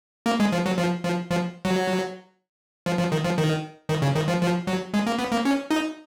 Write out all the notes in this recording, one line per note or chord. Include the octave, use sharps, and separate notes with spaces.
A#3
G#3
F3
F#3
F3
F3
F3
F#3
F3
F3
D#3
F3
D#3
D#3
C#3
D#3
F3
F3
F#3
G#3
A#3
B3
A#3
C#4
D#4